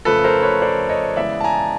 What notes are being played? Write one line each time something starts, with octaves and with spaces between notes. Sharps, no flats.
F2 C#3 F3 A3 A4 B4
A#4 C5
B4 C#5
C5 D5
C#5 D#5
C#3 E3 G#3 B3 D5 E5
A5
G#5 A#5